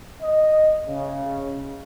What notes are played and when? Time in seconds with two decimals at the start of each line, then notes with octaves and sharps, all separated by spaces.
0.22 D#5
0.87 C#3